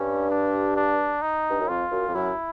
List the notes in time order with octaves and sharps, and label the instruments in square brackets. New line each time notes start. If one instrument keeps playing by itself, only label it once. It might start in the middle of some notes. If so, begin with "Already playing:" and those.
Already playing: [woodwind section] G2 [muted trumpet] C#4
[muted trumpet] D4
D4
D#4
[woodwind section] G2
F#2
[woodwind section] F2 [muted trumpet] F4
[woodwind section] F#2
F2
[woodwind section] F#2 [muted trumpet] E4